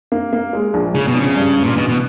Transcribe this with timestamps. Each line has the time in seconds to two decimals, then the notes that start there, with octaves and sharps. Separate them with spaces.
0.12 A#3
0.33 A#3
0.53 G#3
0.74 A#1
0.94 A#1 C#3
1.07 B2
1.14 A#1
1.21 C#3
1.36 G2
1.56 G1
1.64 A#2
1.77 B2 E3
1.89 B2